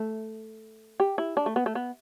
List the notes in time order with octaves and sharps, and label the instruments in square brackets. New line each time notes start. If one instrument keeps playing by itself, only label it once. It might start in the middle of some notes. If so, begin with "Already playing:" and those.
Already playing: [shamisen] A3
G4
E4
D4
A3
B3
A3
B3